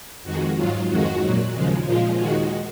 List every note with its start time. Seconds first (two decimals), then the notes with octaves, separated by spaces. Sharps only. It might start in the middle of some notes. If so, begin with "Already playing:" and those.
0.23 F2 D#3 G#3 F#4
0.56 G#2 F#3 F4
0.89 F2 D#3 G#3 F#4
1.22 A#2 F#3
1.54 D#2 C#3 F3 G#3
1.86 A#2 F3 G#3 F4
2.19 D#2 D#3 G#3 F#4